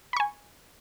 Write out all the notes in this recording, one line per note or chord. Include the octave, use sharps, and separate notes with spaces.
G#5 B5 C#6